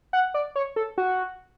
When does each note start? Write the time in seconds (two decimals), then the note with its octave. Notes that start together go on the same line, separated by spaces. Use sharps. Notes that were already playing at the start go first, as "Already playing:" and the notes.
0.13 F#5
0.34 D5
0.56 C#5
0.76 A4
0.98 F#4